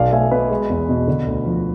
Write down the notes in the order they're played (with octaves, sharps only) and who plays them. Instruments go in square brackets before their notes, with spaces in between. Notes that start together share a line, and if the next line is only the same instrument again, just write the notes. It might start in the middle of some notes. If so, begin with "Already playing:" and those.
Already playing: [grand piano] B1 D5 F5
A3 E5 G#5
B2 B4
G#3
E2
B2
D3
D2
F3